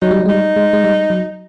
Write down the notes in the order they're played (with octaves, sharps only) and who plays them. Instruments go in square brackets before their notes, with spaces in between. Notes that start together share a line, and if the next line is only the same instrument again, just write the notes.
[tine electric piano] F#3 [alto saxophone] D#4
[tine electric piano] G3
F#3
G#3
[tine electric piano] G3 [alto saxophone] D#4
[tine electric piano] G#3
G#3
G3
F#3